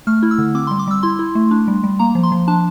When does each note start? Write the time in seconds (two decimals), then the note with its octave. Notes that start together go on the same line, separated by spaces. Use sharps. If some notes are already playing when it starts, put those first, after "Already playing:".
0.07 A3 F6
0.23 E4
0.31 E6
0.38 D3
0.55 C4 D6
0.67 G3 C6
0.79 D6
0.87 G3 E6
1.03 E4 C6
1.19 E4
1.35 A3
1.51 D4
1.68 G3
1.84 G3
1.99 A#3 A#5
2.15 F3
2.23 C6
2.32 F3
2.48 D4 A5